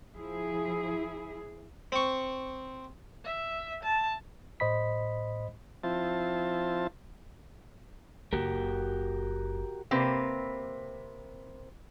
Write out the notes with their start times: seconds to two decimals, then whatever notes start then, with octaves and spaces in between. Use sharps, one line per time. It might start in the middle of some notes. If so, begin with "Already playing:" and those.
0.15 F3 E4 G#4
1.92 C4 C#6
3.25 E5
3.84 A5
4.60 A2 C5 D#5 B5 B6
5.84 F3 C4 E4 F4 C5 A5
8.33 F#1 F#4 G4 A#4
9.91 C3 A#3 C4 B4